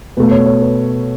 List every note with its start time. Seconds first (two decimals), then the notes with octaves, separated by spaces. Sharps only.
0.17 B2 A3 B4
0.31 C#5
0.47 C#5
0.62 B4